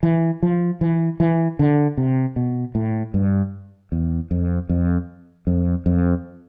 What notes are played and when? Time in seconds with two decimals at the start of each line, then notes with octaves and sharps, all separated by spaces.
0.03 E3
0.43 F3
0.81 E3
1.20 E3
1.59 D3
1.97 C3
2.36 B2
2.75 A2
3.14 G2
3.92 E2
4.31 F2
4.69 F2
5.47 F2
5.86 F2